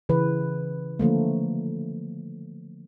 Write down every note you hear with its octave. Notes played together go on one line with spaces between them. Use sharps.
C#3 E3 B4
D3 F3 A3 A#3